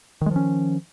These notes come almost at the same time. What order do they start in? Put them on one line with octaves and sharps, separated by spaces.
D#3 G#3 F3 C#4